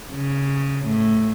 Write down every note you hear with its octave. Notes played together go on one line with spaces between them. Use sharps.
C#3
A2